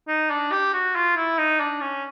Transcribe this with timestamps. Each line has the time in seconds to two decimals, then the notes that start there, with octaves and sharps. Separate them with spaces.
0.08 D#4
0.30 D4
0.52 G4
0.73 F#4
0.95 F4
1.17 E4
1.38 D#4
1.60 D4
1.81 C#4